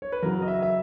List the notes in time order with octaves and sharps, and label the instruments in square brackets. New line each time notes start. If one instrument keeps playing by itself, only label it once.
[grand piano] C#5
B4
F#2 C#3 F#3 A#4
D#5
E5
E5